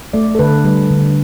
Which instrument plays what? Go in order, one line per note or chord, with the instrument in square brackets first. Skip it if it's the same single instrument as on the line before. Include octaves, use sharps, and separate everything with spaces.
[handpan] A3 D5
A4
D3 B4
G3
D3